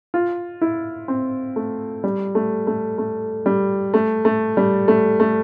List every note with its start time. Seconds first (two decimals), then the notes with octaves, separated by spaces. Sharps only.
0.14 F4
0.61 E4
1.08 C4
1.56 A3
2.04 G3
2.35 A3
2.67 A3
2.98 A3
3.46 G3
3.94 A3
4.25 A3
4.57 G3
4.88 A3
5.20 A3